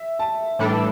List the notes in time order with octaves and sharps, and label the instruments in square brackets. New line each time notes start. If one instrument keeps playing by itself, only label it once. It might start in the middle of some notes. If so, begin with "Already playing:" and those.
Already playing: [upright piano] E5
A5
[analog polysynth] A2 E3 G3 D4 A4